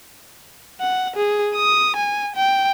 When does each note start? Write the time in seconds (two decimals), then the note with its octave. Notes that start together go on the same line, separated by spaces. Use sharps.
0.80 F#5
1.16 G#4
1.56 D#6
1.96 G#5
2.36 G5